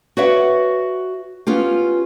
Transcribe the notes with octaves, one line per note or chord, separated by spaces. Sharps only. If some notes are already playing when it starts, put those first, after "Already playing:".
F#4 B4 C#5 D5 E5 F#5
B3 C#4 F4 G4